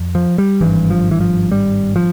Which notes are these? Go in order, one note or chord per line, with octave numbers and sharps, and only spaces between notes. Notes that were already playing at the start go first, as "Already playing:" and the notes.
Already playing: F2
F3
G3
G#1 G2 E3
F3
E3
F3
G3
F3